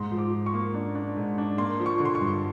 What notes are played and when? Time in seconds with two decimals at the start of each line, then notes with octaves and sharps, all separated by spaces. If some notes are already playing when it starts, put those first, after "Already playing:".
Already playing: G#2 C6
0.11 F3
0.18 D6
0.32 F3
0.46 C#6
0.54 A#3
0.74 D4
0.95 D4
1.16 G#2
1.38 D4
1.58 A#3 C6
1.80 F3
1.86 C#6
2.00 D3
2.05 C6
2.15 C#6
2.21 G2